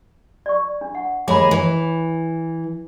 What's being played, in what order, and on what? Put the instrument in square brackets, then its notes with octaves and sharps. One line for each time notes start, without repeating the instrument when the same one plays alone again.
[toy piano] D5 C#6
D4
F#5
[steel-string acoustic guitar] D#2 G#3 G#4 [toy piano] B5 D6
[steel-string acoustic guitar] E3